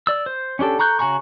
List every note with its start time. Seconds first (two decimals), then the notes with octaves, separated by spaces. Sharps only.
0.07 D5 E6
0.26 C5
0.59 C#4 D4 G4 A4
0.79 A4 A#5 C#6 F#6 G6
0.99 C#3 F#4 G#5 A#5 C#6